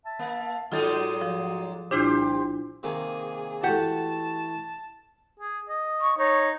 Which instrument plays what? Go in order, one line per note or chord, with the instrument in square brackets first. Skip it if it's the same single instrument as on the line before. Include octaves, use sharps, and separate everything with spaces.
[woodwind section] E5 A5
[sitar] A#3
[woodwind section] G#2 D5 D#6 [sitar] F#3 G#3 D#4 [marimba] F4 A4
[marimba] F3
[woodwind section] C2 A#2 [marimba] D4 E4 F4 [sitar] G4 C5
[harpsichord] C3 D#3 A#3 [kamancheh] G#4
[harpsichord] E3 A3 [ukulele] F#4 G4 F#5 [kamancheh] A5
[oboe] G#4
D#5
[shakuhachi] C#6
[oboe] D#4 [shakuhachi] C#5